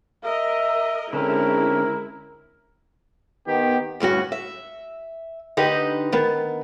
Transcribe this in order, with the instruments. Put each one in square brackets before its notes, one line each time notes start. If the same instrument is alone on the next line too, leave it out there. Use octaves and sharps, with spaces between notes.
[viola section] A#4 D#5 [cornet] E5
[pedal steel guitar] D3 C4 C#4 [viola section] G#3 E4 [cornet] A#4
[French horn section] D#3 B3 [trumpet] G4
[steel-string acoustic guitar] D2 G2 C#4 F#4
E5
D3 D#4 G4 B4 D#5
D#3 B3